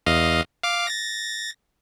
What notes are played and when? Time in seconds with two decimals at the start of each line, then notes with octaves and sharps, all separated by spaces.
0.06 E2 D#5 F5
0.63 F5 D6
0.87 A6 A#6